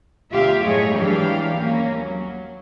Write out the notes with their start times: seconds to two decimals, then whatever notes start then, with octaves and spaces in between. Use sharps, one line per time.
0.31 D2 B2 F4 G4 E5 F5
0.62 F#2 A2 A3 G#4 C#5 D#5
0.93 G#2 E3 F#3 D4 G4 F5
1.57 D#2 A#3 C#4
1.98 F#3